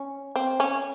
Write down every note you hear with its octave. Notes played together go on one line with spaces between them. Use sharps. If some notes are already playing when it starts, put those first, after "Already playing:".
Already playing: C#4
C4
C#4